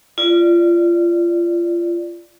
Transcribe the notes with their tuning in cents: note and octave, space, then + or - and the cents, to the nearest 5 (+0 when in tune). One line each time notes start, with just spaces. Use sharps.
F4 -25 D5 +0